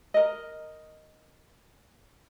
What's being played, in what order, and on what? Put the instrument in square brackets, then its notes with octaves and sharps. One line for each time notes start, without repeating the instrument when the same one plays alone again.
[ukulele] A#4 D#5